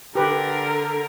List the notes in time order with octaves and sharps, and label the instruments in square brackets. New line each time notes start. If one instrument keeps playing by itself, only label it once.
[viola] D3 A#4 [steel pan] G4 B4